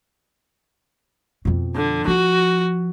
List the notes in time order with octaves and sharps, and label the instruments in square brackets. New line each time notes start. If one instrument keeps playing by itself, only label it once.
[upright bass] F2 B2
[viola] D3
[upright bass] F3 [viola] F#4